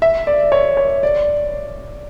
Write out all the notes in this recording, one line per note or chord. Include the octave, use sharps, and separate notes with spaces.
E5
D5
C#5
C#5
D5